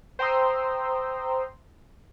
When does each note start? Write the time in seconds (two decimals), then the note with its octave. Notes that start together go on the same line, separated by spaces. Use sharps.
0.19 C5 G5 A#5 C6 D#6 E6